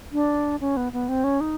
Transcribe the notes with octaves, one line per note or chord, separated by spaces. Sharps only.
D4
C#4
B3
B3
C4
C#4
D#4